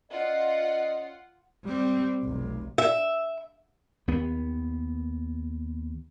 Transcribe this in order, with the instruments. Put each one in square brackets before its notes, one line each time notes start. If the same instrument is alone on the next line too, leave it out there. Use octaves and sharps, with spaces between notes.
[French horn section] C#4 D5 D#5 [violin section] F4 F#5
[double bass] G3 C4
F1 B1
[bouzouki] E5
[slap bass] D#2 B3